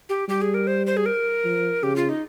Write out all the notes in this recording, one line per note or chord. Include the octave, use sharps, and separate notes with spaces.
G4
G3 G4
G#4
A#4
C5
C5
G#4
A#4
F3
C#3 G4
F4
D#4